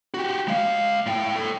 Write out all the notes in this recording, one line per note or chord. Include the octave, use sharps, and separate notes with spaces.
F#4 G4
G#3 F5
A2 G5
A4 G5